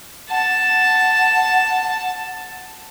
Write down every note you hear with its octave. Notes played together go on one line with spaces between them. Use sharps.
F#5 A5